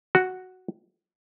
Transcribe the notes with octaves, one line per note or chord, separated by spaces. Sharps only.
F#4